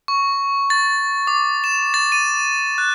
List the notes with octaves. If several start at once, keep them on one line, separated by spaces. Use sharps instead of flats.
C#6
A6
D6
E7
A6
D#7
F#6